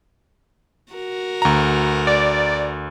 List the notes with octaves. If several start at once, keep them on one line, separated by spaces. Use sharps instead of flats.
F#4 A#4
D2 A#5
D5